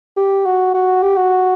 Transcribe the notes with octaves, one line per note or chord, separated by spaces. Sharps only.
G4
F#4
F#4
G4
F#4